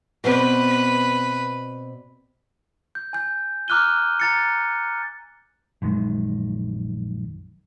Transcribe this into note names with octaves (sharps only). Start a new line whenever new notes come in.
B2 C4 B4 D5
G6
G#5 G6
A#5 D6 F6 F#6 D#7 G7
A#5 A6 C#7
A#1 F#2 D#3 G#3